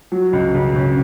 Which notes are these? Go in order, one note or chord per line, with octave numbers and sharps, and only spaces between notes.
F#3
C#2
C#3
C#3